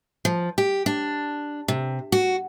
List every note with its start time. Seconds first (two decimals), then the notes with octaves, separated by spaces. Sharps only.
0.25 F3
0.58 G4
0.86 D4
1.68 C3
2.12 F#4